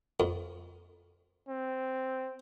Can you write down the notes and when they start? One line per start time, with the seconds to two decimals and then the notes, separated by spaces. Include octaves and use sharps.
0.20 F2
1.48 C4